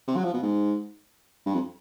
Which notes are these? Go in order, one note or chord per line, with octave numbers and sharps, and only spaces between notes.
C3
F#3
F3
B2
G#2
G2
F2